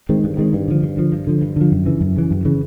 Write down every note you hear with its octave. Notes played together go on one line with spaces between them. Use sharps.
D#3 G#3 C4
G2
D#3 G#3 C4
G2
D3 F3
G2
D3 F3
G2
D3 F3
G2
D3 F3
F#2
C#3 E3
F#2
C#3 E3
F#2
C#3 E3